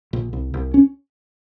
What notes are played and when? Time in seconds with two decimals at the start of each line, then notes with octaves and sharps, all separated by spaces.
0.13 A#1
0.33 C2
0.54 C2
0.74 C#4